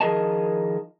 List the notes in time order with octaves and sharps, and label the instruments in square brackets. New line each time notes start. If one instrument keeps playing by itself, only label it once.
[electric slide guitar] D#3 F3 G#4 A#4 D#5 A5